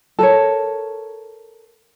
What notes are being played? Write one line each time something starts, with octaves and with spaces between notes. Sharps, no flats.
A4 A#4 C#5